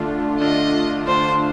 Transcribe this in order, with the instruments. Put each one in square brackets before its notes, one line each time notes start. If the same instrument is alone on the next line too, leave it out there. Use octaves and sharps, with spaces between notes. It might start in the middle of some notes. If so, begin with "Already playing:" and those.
Already playing: [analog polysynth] D3 A3 D4 F4
[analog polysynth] D3 A3 D4 F4 [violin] D#5
[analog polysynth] D3 A3 D4 F4 [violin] C5